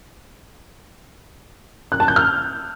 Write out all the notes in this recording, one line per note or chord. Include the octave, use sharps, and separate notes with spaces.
F#6
A5
G6
F6